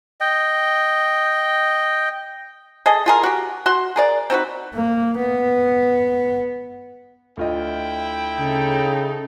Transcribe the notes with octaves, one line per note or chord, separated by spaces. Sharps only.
D#5 G5
G#4 A4 D#5
F4 G#4 A#4
F#4 G4
F#4 F#5 C6
G#4 A#4 D5
C4 D#4 F#4 B4
A#3
B3
D2 E4 F4 D#5 G5
C#3 D#4 A4